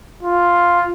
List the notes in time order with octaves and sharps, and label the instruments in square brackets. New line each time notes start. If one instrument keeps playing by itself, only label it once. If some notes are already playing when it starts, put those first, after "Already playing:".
[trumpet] F4